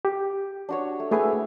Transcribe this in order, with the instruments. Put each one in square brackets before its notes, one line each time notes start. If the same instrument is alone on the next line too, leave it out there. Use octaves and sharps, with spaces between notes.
[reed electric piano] G4
[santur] D4 F#4 C#5
A3
[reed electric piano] A3 G#4 B4 [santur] E4 G5 G#5